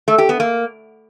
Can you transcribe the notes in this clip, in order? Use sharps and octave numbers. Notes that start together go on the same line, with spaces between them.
A3
G4
B3
A#3